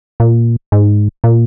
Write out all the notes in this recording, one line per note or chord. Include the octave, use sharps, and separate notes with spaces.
A#2
G#2
A#2